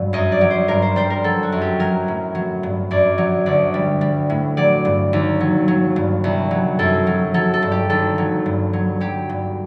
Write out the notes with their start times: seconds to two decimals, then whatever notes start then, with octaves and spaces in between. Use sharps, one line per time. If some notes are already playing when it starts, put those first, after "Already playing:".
Already playing: G2 F#3
0.13 F#2 D#5
0.32 D5
0.41 F#3
0.50 C5
0.68 G2 A#4
0.82 C5
0.96 G3 C5
1.10 A#4
1.24 F#3 A4
1.43 F#4
1.52 F#2
1.61 G4
1.80 F#3 A#4
2.08 A2
2.35 F#3
2.63 G2
2.91 F#2 D5
3.18 F#3
3.46 D2 D5
3.74 G3
4.01 G3
4.30 A2
4.57 F#3 D5
4.85 G2
5.13 D#2
5.41 F#3
5.68 F#3
5.96 G2
6.24 C2
6.51 F#3
6.79 F#2 A4
7.07 F#3
7.34 F#3 A4
7.54 A4
7.62 G2
7.72 G4
7.90 D#2 A4
8.18 F#3
8.46 G2
8.73 F#3
9.01 F#3 G4
9.29 G2